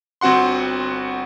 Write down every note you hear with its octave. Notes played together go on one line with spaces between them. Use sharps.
G1 C4 F#4 F#5 C6